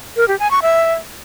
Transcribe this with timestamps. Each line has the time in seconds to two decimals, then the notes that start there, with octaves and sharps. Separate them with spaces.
0.17 A#4
0.28 G4
0.39 G#5
0.51 C#6
0.62 E5